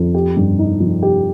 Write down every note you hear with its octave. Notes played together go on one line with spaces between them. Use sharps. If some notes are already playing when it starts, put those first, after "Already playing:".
Already playing: F2
G4
G2
D#4
F3
G4